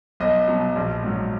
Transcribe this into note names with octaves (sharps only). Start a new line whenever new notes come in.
B1 D#5
B2 F#3
A#1
G#2 F#3